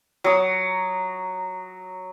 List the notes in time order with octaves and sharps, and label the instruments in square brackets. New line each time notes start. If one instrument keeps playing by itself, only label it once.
[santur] F#3 D#6